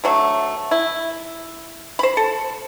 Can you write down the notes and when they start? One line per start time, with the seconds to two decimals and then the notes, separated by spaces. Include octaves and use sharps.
0.04 D3 F#3 A3
0.71 E4
1.99 C5 B5
2.17 A4